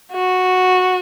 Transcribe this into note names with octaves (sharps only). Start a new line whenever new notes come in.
F#4